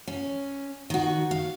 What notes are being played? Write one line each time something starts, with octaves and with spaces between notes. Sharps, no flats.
C#4
D#3 F#4
F5